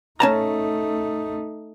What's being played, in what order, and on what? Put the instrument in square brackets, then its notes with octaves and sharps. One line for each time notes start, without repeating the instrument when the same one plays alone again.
[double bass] A3 D#4 [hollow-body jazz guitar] C#4 A5 A#5